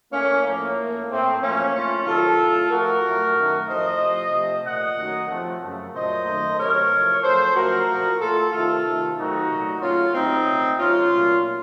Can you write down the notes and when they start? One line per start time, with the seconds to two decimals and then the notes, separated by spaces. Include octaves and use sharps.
0.12 A2 A3 A#3 C#4
0.44 A2 F3 A3 A#3
0.77 A2 A3
1.09 A2 A3 C4
1.41 F#2 F3 A3 A#3 C#4
1.73 A2 A3 C#4 F4
2.06 C3 D#3 F#3 F4 A4
2.39 A2 A3
2.70 A2 F3 A3 F#4 A#4
3.03 A2 F#3 A3
3.35 F#2 D#3 A3
3.67 A2 F3 A3 C5 D#5
4.00 C3 F3 A3
4.32 C3 F3 A3
4.64 A#2 A3 D#5 F#5
4.97 F#2 D#3 F#3 A3
5.29 C3 F3 A3
5.62 F#2 C#3 A3
5.94 A#2 F#3 A3 C5 D#5
6.26 F#2 D#3 A3
6.59 C3 F#3 A3 A#4 C#5
6.91 A2 F3 A3
7.23 F#2 F3 A3 A4 C5
7.55 F#2 F3 A3 F#4 A#4
7.88 A#2 F3 A3
8.20 A2 A3 F4 A4
8.52 C3 D#3 A3 F4 A4
8.84 C3 D#3 A3
9.17 C3 D#3 F#3 A3 D#4 F#4
9.50 A#2 F#3 A3
9.82 F#2 C#3 A3 C#4 F4
10.14 C3 F#3 A3 C4 D#4
10.47 A#2 A3
10.79 C3 F#3 A3 C#4 F4
11.11 A#2 F#3 A3